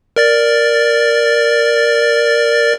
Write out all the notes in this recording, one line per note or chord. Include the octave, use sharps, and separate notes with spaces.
A#4 D5 A6